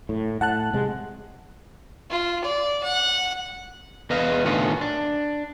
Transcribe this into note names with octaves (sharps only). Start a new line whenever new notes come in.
A2
A2 F#5 A5 F#6
C3 G#3
F4
D5
F#5
E2 B4 D#5 F5
A2 D3 D#3 B3 C#4 F4
D4